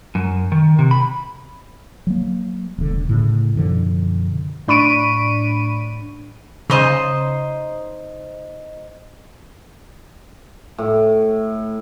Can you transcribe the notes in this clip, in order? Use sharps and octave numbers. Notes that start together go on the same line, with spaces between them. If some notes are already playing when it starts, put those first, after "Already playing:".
F#2
D#3
C3
B5
F#3 A#3
E1 D3
A2 C#3
F#2 B2 D3 F3
A2 D4 B5 C#6 D7 D#7
C#3 D#4 C5 D#5
A2